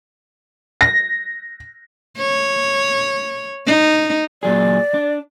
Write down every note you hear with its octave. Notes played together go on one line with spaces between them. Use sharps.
A#6
C#5
D#4
A#2 F#3 G#4 D5
D4